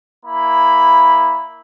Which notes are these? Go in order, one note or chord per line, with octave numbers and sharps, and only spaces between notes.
A#3 E4 B5